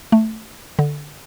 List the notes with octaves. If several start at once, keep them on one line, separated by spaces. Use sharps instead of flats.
A3
D3